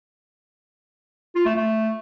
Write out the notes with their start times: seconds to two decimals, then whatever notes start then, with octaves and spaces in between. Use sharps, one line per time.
1.35 F4
1.45 A3
1.56 A3